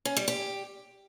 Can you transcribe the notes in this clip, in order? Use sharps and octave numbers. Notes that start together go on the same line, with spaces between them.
C#4
G3
G4